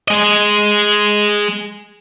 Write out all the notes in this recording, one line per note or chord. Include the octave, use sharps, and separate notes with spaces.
G#3 D#5